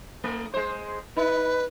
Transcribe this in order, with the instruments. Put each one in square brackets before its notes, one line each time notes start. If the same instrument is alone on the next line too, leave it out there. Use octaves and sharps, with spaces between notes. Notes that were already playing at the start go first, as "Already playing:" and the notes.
[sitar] A3
G#3 C5
[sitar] D#4 [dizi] B4